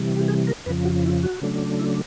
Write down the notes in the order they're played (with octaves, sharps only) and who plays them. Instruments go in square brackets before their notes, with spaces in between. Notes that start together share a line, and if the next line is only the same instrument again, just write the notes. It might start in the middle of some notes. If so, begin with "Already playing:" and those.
Already playing: [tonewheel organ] C3 E3 G3
G4
G#4
A#4
F2 C#3 F3 B4
F#4
E4
F#4
C#3 F#3 A3 D4
E4